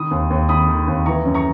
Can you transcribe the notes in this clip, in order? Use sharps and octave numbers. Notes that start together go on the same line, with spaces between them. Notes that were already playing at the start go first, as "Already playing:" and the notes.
Already playing: D#3 B5 D#6
D#2
D#2
D#3 B5 D#6
D#3
D#2
E3 A#5 C#6
F#2
A#5 C#6